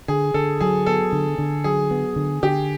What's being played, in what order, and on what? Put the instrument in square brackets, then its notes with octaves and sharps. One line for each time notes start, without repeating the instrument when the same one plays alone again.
[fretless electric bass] D3 [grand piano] G#4
[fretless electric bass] D3 [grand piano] A4
[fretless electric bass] F#3 [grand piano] G#4
[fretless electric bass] B3 [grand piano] A4
[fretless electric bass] D3
D3
[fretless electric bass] F#3 [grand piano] G#4
[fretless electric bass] B3
D3
[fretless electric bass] D3 [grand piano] G4